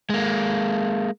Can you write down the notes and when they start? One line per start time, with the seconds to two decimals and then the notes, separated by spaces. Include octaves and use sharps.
0.10 G#3 A#3